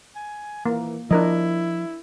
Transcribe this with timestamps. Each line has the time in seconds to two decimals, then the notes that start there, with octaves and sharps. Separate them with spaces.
0.16 G#5
0.66 E3 A#3
1.11 F3 D4 E4 A#4 D#5